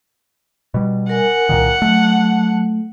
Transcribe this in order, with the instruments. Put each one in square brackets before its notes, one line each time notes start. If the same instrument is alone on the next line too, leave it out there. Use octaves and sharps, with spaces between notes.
[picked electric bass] B2 G3
[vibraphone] A#4 G#5 [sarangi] F#5
[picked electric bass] C2 A#2 D#3
[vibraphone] F#3 A5 [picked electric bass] A3